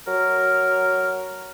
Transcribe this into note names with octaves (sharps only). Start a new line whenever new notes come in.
F#3 A#4